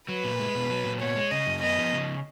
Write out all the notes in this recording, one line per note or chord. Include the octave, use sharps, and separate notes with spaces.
F#3 B4
A#2
G#3
B2
F#3
A#2
B3 C#5
G#3
C#3 D#5
F#2
B3 D#5
F3
C#3